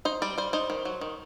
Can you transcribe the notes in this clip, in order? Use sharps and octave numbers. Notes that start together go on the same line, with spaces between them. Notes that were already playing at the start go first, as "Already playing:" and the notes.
D#4 C5
G3 D5
G3 C5
D#4 C5
D#3
F#3
D#3